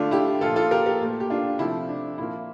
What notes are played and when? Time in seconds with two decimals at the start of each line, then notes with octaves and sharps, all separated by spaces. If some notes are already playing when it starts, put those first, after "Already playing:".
Already playing: D3 A3 D4 F4
0.11 E4 G4
0.41 A#2 F3 A#3 F4 A4
0.56 F4 A4
0.71 G4 A#4
0.86 G4 A#4
1.01 A#2 A3
1.20 G4
1.30 D4 F4
1.59 C3 F3 A3 E4
1.89 D4
2.18 A#2 F3 A#3 E4